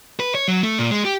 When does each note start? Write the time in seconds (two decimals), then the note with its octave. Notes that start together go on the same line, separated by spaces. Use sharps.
0.20 B4
0.35 C#5
0.48 F#3
0.63 A3
0.79 A#2
0.91 G#3
1.05 G4